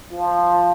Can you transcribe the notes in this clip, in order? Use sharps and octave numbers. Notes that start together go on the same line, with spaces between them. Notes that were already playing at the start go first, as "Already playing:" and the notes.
F3